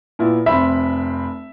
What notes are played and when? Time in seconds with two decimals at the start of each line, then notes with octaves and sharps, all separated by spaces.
0.19 A#2 B3 E4
0.46 F1 C4 E5 B5